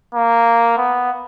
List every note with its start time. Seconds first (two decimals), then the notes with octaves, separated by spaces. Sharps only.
0.14 A#3
0.78 B3